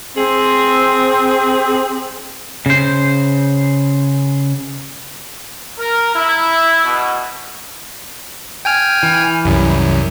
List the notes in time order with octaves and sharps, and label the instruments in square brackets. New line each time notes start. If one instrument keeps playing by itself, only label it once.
[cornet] C4 [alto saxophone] G#4
[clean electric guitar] C#3 C5
[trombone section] A#4
E4
B2
[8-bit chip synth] G5 G#5 F6
[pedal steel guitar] E3
[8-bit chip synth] C2 F#2